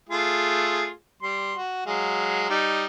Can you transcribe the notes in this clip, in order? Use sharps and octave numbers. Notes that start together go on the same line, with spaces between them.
A3 F4 G#4
G3 C6
F#4
F#3 G#3 F5
G3 D#4